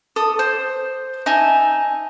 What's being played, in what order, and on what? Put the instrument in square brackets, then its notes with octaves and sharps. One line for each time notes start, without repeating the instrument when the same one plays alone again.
[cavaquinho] A4 D#6
C5
D#4 E5 G#5 A5